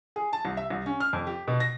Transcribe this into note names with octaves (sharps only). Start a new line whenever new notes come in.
G#4
A5
C2
E5
C2
C#4
F6
F2
G4
B2
A#6